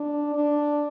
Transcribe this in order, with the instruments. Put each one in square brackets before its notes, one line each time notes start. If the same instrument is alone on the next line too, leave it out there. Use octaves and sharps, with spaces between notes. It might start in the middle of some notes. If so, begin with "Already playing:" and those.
Already playing: [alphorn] D4
D4